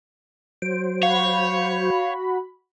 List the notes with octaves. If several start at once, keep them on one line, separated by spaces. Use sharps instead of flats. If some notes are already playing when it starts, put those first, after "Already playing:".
F#3 C5 D7
F#4 C#5 F5 B5